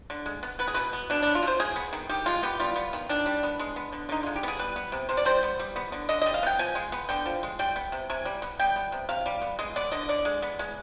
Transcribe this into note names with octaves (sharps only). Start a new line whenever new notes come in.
D3
G#3
B3
B3 B4
G#4
B2 B4
B3
B2 D4
B3 D4
F4
B2 C5
G#3 G#4
B3
D#3
D#3 G4
G#3 F4
B3 G4
G3 F4
B3
D#3
D#3 D4
G3
B3
G#3
B3
D3
D3 D#4
G#3 F4
G4
B3 G#4
G3 B4
B3
C3
C3 C5
D5
G3 C5
B3
G3
B3
D3
D3 D#5
G3 D#5
F5
B3 G5
F3 G#5
G#3
B3
D3 G5
F3
G#3
G3 G5
B3
C3
C3 G#5
G3
B3
G3 G5
B3
C3
C3 F5
G3
B3
G#3 D#5
B3 D5
D3 D#5
D3 D5
G#3
B3
G#3